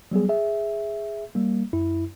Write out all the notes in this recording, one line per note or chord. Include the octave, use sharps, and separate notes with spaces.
F#3 G3 B3 G#4
G#4 E5
G3 A#3
F#2 E4